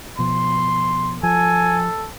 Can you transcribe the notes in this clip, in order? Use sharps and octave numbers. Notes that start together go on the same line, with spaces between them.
B2 F3 C6
F3 A4 G#5